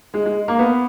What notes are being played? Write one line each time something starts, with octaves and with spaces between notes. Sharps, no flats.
G#3
G#3
A#3
B3